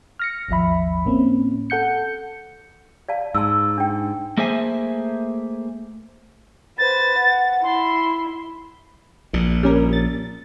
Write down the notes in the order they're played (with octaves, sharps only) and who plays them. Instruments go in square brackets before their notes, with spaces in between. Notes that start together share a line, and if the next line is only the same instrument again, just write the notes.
[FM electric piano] F6 A#6 C#7
G#1 D#2 F3 E5 B5
A2 A#3 C4 C#4
A4 F#5 G6 C#7
[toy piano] D5 F5 A5
[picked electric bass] G#2 [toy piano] A5 C6 E6
[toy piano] D4 G5
[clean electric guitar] A3 A#3 G#4 C5 E5 G#5
[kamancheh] B4 C5 [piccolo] A6
[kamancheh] F#5
[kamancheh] E4 [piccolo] C6
[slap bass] A#1 A#2
[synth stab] G3 C#4 A#4
A6